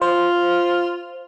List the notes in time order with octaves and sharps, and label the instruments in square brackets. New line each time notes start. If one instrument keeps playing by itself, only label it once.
[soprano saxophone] F4 [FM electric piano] C5